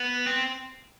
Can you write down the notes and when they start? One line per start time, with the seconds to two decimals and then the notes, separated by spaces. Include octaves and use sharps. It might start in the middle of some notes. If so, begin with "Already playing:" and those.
Already playing: B3
0.27 C4